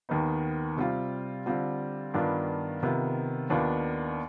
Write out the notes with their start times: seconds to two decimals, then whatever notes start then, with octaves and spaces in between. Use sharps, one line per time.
0.09 D#2 D#3 B3 D#4
0.77 C3 G3 C4 F4
1.46 D3 G3 C4 F4
2.14 G2 D#3 B3 D4 F4
2.83 C3 D#3 B3 F4
3.50 D#2 D#3 B3 D4 F4